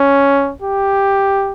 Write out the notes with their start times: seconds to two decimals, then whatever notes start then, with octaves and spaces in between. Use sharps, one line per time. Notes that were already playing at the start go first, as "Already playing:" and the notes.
Already playing: C#4
0.63 G4